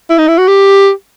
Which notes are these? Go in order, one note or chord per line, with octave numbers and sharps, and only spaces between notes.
E4
D#4
E4
F#4
G4